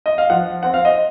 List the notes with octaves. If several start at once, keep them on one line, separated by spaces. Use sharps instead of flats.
D#5
F5
F3 F#5
C4 F#5
F5
D#5